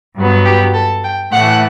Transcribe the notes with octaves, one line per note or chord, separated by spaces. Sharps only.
G2 F#3 B3
G4
A4
G5
A2 E3 A3 F#5